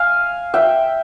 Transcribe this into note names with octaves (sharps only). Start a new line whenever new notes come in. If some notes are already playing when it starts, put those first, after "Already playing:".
Already playing: F5 G#5
E5 G5